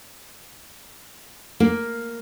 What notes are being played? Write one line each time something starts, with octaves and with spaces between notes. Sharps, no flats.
A#3